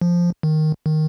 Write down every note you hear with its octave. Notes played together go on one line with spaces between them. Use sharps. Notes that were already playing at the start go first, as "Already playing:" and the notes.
F3
D#3
D#3